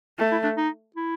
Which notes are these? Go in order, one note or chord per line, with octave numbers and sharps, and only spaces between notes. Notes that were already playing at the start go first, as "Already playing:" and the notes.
A3
E4
D4
D#4
E4